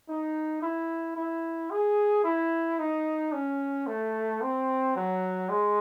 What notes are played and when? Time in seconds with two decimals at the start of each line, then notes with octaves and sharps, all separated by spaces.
0.09 D#4
0.62 E4
1.16 E4
1.70 G#4
2.24 E4
2.79 D#4
3.32 C#4
3.87 A3
4.42 C4
4.96 F#3
5.49 G#3